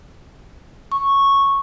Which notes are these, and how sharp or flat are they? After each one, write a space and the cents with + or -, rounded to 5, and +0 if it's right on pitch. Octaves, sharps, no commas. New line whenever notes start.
C#6 -5